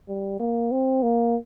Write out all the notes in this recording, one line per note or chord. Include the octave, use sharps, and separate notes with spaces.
G3
A#3
C4
A#3